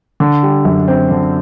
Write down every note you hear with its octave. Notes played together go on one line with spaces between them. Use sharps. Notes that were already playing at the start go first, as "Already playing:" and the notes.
D3
G3
F#2
C4
D3